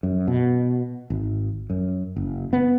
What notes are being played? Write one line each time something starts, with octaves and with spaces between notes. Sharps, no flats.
F#2
B2
G#1
F#2
F#1
B3